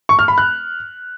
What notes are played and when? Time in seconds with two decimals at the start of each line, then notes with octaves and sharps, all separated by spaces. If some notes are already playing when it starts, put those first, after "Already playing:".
0.09 C#6
0.19 F6
0.28 B5
0.38 F#6